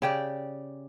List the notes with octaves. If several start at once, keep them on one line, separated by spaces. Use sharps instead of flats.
C#3 G4 D5